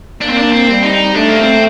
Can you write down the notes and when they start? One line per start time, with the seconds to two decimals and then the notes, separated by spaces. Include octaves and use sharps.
0.21 A#3 D4
0.30 C4
0.38 D4
0.52 C4
0.69 G3
0.84 D#4
1.15 A3 D4
1.28 A#3
1.39 C4